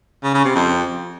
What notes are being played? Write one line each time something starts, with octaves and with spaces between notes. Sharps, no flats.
C#3
C#3
C3
F2